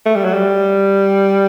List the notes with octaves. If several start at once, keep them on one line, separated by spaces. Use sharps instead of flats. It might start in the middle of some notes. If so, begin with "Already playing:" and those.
A3
G3
F#3
G3